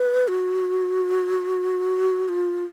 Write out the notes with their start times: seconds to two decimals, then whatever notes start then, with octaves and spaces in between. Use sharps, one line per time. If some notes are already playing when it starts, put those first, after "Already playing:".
Already playing: B4
0.28 F#4
2.29 F4